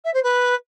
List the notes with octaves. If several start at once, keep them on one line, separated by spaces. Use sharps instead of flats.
E5
C5
B4